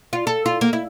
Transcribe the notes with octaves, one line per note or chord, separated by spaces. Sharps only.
F4
A4
F4
A#3
E4